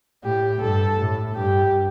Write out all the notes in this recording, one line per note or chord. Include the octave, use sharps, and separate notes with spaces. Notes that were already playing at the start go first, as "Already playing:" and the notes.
A2 G4
G2 A4
A2
G2 G4